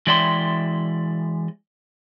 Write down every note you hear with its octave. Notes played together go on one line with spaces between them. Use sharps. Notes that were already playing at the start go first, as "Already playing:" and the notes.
E3 G#3 D5 E5 G5 C6